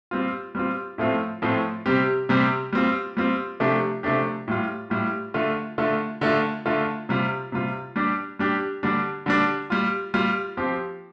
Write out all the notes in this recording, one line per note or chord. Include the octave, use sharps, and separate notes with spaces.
G3 C4 F4
G3 C4 F4
A2 F3 A3 C4 F4
A2 F3 A3 C4 F4
C3 G3 C4 G4
C3 G3 C4 G4
G3 C4 F4
G3 C4 F4
C3 F3 A3 D4 G4
C3 F3 A3 D4 G4
A2 G3 F4
A2 G3 F4
D3 A3 F4
D3 A3 F4
D3 A3 F4
D3 A3 F4
C3 G3 F4
C3 G3 F4
G3 D4 G4
G3 D4 G4
D3 G3 D4
D3 G3 D4
G3 F4
G3 F4
F3 C4 G4